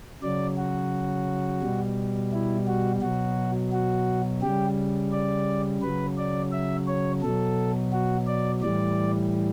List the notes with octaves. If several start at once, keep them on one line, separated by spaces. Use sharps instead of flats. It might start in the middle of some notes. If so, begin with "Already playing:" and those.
C#3 F#3 D5
F#4
B2 G3
E4
F#4
B2 F#3 F#4
F#4
C#3 G3 G4
D5
C#3 F#3 B4
D5
E5
C#5
B2 F#3 A4
F#4
D5
A2 E3 G3 D5